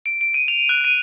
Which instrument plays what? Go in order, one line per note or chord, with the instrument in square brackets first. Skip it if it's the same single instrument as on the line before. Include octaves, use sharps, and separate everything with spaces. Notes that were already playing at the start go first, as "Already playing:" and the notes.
[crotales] D7
D7
D#7
F7
F#6
D#7